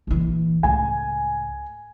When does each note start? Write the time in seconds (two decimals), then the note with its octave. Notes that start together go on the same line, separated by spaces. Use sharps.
0.07 A#1 E3
0.63 C#2 A2 G#5